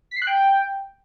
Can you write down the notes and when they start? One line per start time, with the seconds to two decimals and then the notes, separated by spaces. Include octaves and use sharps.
0.11 B6
0.16 C7
0.22 F#6
0.27 G5